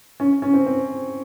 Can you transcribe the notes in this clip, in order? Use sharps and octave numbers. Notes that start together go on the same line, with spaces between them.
C#4
C#4
C4
C4